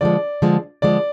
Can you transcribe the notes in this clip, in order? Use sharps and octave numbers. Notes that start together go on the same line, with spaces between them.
D3 F3 G#3 D5
D3 F3 G#3
D3 F3 G#3 D5